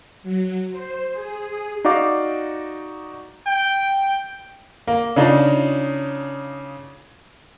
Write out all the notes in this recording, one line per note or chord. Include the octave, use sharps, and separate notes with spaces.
F#3
C5
G#4
D#4 F#4 D5 F5 D6
G5
A#3
C#3 D4 D#4 F4